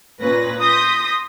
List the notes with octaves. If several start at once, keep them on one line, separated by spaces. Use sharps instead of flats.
A#2 C#4 B4 A#6
C6 D#6 G6 A#6 B6